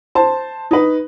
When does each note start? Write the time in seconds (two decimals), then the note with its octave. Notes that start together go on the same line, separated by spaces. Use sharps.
0.15 C5 A5
0.71 D#4 B4